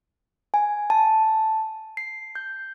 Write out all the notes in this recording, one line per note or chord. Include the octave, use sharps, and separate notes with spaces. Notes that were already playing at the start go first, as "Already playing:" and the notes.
G#5
A5
C7
G6